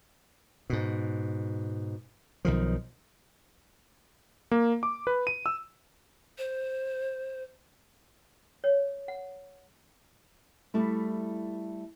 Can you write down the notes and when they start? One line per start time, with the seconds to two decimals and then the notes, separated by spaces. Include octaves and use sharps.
0.70 G#2 B2
2.45 B1 D#3 F3
4.51 A#3
4.83 D6
5.07 B4
5.27 D#7
5.46 E6
6.38 C5
8.64 C#5
9.08 F#5
10.74 G3 A3 E4